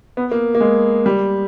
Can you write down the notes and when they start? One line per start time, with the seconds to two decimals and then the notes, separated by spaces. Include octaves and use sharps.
0.17 B3
0.31 A#3
0.55 A#3
0.61 G#3
1.06 G3